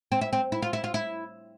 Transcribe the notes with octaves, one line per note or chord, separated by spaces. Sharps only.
C4
E4
C4
E4
F4
E4
F4
E4